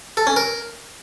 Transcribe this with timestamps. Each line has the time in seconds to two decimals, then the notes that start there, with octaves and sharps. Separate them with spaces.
0.17 A4
0.27 C#4
0.36 A#4